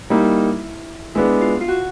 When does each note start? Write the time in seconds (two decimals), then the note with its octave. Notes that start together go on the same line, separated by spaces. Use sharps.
0.10 G3 A#3 D#4 E4
1.15 G#3 B3 D4 E4
1.41 F4
1.61 F4
1.68 F#4